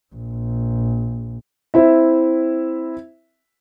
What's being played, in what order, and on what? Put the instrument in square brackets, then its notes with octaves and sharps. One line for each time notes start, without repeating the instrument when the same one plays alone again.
[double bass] A#1
[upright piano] C4 E4 E5